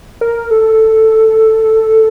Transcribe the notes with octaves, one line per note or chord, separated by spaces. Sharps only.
A#4
A4